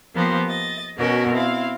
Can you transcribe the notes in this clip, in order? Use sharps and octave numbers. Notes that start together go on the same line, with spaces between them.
F3 A#3 B3 G4 C5
D#5 A6
B2 B3 C#4 F#4 A#4
C4 E4 F5